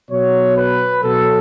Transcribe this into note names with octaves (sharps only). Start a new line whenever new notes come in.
B2 F#3 C#5
B4
B2 F#3 A4